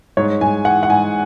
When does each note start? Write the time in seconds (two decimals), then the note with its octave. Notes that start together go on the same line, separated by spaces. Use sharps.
0.17 G#2 C#5
0.41 G#2 G#5
0.65 E3 F#5
0.83 F#5
0.90 G#2 G#5